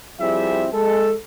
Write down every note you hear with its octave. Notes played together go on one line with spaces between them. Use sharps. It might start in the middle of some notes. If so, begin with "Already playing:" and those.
F3 G3 C4 E4 G#4 E5
G#3 A4